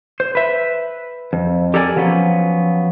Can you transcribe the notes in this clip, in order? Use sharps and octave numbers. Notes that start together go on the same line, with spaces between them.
C5
B4 E5
F2
G4 A4 A#4 D5 E5 G#5
F3 F#3 B3 C#4